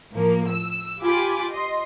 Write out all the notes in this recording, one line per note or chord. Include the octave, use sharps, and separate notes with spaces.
A2 F3 A#3
E6
F4 G4 G#5 B5 D6
D#5 C6